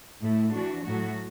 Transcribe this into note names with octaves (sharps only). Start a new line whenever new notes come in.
A2 A3 E4
E3 D4 F#4
A2 F#3 A3 F#4